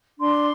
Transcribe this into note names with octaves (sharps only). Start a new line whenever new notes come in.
D4 C6